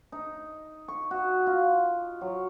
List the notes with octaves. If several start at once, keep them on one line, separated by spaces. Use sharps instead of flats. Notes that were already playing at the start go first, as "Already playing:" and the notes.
D#4
C#6
F#4
F4
F#3